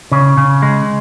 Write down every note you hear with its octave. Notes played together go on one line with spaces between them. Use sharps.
C#3
C#3
G#3